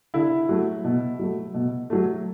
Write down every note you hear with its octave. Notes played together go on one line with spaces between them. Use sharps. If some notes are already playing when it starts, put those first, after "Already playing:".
D3 E4
F#3 A3
B2
F#3 A3
B2
F#3 A3